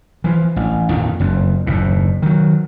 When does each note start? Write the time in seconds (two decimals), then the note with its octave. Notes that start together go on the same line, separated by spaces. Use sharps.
0.24 E3 F3
0.56 A1
0.90 F2 A#2 D#3
1.20 F#1 F2
1.67 F#1 D#2 A2
2.22 D#3 F#3